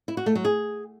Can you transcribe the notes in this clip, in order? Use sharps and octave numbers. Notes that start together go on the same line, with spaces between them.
E4
F#4
A3
F#3
G#4